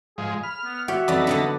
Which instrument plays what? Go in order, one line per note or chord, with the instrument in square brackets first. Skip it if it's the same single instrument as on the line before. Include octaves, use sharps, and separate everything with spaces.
[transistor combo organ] G#2 F3 G#3 [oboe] G#4
[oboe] B5 [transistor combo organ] F6
[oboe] B3
[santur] F#4 F#5 [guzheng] C#5 D5 G5 [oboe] E5
[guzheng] F2 G3 [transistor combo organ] D#4 B4 A5 [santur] D5
[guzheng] D3 F#3 B3